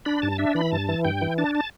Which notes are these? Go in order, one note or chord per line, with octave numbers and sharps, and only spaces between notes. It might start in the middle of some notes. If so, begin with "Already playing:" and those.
D4 B5
G2 A5
D4 E5
E3 B5
G2 A5
E3
G2 G5
E3
D4 A5
A5